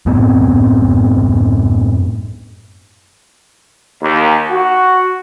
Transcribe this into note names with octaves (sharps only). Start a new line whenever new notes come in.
F#2 A2 B3 C4
D#2
F#4